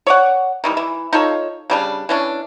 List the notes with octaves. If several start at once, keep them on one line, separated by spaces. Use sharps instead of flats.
C#5 D5 F#5
D#3 E3 G3
E3
D#4 F4 A4 C#5
C#3 G3 D4
E3 C#4 D4